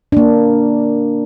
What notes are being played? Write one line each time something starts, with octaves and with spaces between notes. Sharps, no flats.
A#3 D4